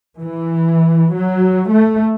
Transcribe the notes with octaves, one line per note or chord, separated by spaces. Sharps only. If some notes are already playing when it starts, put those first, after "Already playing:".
E3
F#3
A3